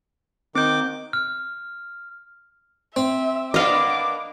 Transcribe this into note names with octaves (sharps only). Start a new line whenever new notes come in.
D#3 C4 D6 G6
F6
C4 E5
A#3 B3 D4 D#5 F5 D6